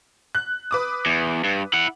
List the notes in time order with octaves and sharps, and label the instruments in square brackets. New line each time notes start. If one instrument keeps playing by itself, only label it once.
[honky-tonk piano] F#6
B4 D6 D#6
[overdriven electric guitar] E2
G2
E4 F#5